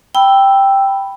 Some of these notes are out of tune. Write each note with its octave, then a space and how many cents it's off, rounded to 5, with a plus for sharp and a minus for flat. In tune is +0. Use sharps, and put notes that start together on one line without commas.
G5 +0 B5 +0 E6 +0